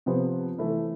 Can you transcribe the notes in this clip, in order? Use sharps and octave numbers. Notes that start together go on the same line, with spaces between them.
C3 F3 B3
E3 A3 E4